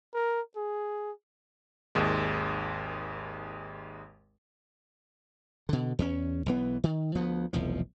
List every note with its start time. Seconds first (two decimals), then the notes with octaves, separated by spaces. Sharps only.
0.14 A#4
0.56 G#4
1.95 G#1 D#2 G#3
5.69 B2 D3
5.99 E2 A3 C#4
6.46 B1 E3 B3
6.84 D#3
7.15 D2 F3 B3
7.53 F1 B1 E2 F3